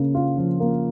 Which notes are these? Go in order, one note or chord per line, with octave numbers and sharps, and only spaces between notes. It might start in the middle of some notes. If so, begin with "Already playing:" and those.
Already playing: C#3 A#3
F4
F3
A#3